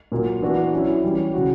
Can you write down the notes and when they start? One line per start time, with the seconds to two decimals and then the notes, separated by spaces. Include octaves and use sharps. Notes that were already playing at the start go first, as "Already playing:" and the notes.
0.12 A#2 F#3 A#3
0.42 E3 B3 D4 F#4
0.73 F#3 C#4 E4
1.03 E3 G3 C#4
1.34 C#3 F#3 C#4 F#4